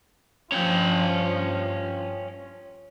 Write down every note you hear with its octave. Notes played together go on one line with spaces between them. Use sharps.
G2 F3 C#4 G5